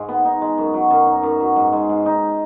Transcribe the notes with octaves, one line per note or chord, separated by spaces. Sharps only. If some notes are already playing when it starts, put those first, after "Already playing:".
Already playing: G#2 G#3
B3
D#4
G#3
F#2
F#3
F#2
D#4
F#2
F#3
G#2
G#3
G#2
D#4